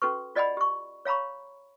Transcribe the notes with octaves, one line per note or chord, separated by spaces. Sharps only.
C#4 F#4 A4 B4 C#6
F4 D5 D#5 F#5 G#5 B5
G4 C#6
C#5 F5 A#5 B5 C#6